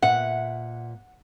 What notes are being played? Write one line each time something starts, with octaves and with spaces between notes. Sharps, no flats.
A#2 B4 E5 F#5